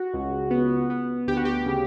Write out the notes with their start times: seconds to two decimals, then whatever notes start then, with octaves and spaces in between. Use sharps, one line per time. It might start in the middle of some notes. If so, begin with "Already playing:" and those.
Already playing: F#4
0.14 C#2
0.51 B3
0.90 B3
1.27 D2 G4
1.37 F#4
1.45 G4
1.66 C#3